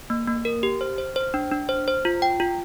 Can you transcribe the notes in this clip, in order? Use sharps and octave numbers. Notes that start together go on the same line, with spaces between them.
A#3
A#3
A#4
G4
C5
C5
C5
D4
D4
C5
C5
F4
G5
F4